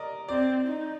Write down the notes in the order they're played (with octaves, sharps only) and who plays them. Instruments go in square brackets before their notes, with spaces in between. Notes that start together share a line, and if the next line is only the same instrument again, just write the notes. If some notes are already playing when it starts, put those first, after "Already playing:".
Already playing: [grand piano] A#4 D5 D#5
[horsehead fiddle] C4 [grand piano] D5
[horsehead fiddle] D#4